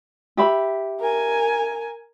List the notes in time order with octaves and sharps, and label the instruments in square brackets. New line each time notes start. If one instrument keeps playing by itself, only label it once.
[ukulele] G4 E5 B5
[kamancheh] A#4 G#5